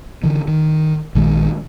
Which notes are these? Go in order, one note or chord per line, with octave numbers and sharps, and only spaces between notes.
D3 E3
D#3
A#1 D#3 G#3